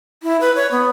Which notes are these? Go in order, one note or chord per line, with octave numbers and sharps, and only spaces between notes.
E4
B4
C#5
B3